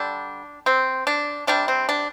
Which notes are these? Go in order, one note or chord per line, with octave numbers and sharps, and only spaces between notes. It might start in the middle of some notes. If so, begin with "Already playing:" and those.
Already playing: D3 G3 D4
C4
D4
C3 G3 D4
C4
D4